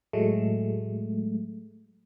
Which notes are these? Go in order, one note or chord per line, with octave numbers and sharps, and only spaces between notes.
A2 F#3 G#3 A3